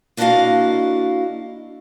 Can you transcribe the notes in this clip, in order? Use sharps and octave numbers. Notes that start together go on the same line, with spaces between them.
A#3 D4 E4 F#4 D#5 F5